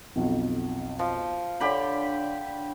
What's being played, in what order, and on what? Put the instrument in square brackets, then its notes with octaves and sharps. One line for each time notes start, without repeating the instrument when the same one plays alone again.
[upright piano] B1 F2
[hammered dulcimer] F3
[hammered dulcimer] D3 G4 B5 [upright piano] D4 C#5